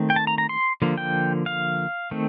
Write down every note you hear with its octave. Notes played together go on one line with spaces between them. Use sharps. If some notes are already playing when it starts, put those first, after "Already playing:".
Already playing: D#3 A3 C4
G5
A5
A#5
A#5
C6
D3 F3 A#3
G5
F5
D#3 A3 C4